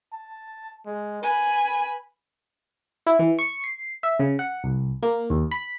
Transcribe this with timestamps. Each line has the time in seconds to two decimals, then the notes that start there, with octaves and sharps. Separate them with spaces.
0.13 A5
0.86 G#3
1.23 B4 G#5 B5
3.07 E4
3.19 E3
3.39 C#6
3.64 C7
4.03 E5
4.19 C#3
4.39 F#5
4.64 C2
5.03 A#3
5.30 D#2
5.51 B5